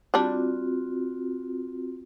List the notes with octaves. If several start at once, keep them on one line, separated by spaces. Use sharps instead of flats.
G3 C4 D4 F4 F#4